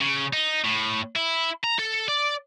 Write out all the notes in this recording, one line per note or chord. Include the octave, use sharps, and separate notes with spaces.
C#3
D#4
A2
E4
A#5
A4
D5